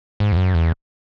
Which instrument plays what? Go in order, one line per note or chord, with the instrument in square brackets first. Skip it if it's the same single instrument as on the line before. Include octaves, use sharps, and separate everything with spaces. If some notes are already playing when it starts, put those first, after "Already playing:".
[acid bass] G#2
E2
F#2
E2